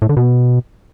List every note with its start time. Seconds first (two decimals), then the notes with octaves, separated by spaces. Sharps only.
0.02 A2
0.09 D3
0.17 B2